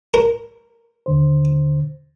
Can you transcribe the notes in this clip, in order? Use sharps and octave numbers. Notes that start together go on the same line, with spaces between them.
A#4
D#2 D3 C5